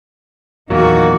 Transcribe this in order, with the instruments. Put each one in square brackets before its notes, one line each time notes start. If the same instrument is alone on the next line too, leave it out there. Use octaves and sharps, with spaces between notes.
[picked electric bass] E2 A#2 F#3 [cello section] D#3 F#4 [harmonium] A#3